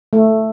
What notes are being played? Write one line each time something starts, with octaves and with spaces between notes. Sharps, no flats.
A3